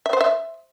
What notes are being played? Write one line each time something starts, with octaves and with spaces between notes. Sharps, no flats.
E5
C5
E5